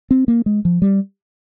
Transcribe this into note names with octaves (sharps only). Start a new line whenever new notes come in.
C4
A#3
G#3
F3
G3